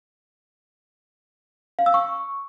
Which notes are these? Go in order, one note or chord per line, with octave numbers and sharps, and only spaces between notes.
F5
E6
C#6